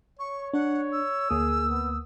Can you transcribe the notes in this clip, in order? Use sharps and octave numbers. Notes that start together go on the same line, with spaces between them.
C#5 C#6
D4 F#5
E6
D2 A#3 G#4 D#6
B3